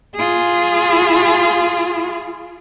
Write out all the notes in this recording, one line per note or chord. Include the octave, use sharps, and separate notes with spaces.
F4 G#4